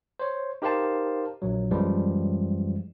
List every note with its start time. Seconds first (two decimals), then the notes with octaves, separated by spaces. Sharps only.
0.19 C5 C#5
0.62 D#4 G4 A#4 C5 F5 A5
1.42 A#1 F#3
1.71 F#2 E3 F3 G3 G#3